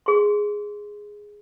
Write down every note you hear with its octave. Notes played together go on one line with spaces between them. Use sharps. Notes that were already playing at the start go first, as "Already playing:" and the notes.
G#4 C6